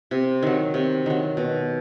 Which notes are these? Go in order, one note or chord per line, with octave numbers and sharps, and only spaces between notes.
C3
D#3 F#3
C3
D#3 F#3
B2